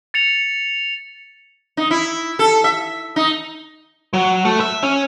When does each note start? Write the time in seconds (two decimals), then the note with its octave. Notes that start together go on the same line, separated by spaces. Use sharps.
0.14 A6 C#7 F7
1.77 D#4
1.91 E4
2.39 A4
2.64 E5
3.16 D#4
4.13 F#3
4.45 A3
4.60 E5
4.83 C#4